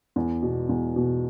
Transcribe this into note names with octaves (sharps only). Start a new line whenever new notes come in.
E2
B2
E2
B2